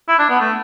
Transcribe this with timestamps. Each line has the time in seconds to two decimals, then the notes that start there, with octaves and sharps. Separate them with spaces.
0.08 E4
0.19 D4
0.29 B3
0.40 A3